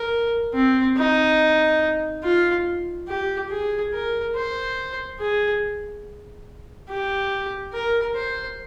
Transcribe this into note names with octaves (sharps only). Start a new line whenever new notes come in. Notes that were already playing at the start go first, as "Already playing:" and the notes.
Already playing: A#4
C4
D#4
F4
G4
G#4
A#4
C5
G#4
G4
A#4
C5